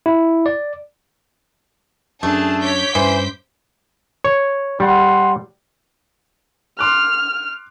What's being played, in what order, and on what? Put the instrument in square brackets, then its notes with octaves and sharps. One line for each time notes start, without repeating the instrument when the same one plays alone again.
[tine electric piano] E4
D5
[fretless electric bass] F#2 [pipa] A3 [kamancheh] D4 G#4 [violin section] A5
[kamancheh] C#5 [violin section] D6 G6 B6
[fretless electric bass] G2 C#4 [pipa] E3 [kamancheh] C5 C6
[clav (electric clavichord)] C#5
[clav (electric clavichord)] G3 [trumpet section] F#5 C6
[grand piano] C6 D6 F#6 [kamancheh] F6